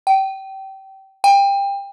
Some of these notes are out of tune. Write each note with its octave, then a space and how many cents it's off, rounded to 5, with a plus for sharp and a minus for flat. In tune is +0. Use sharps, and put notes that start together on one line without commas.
G5 -25
G5 +25